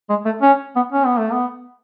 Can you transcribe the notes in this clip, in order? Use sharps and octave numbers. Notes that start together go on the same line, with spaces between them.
G#3
A3
C#4
B3
C#4
B3
A3
B3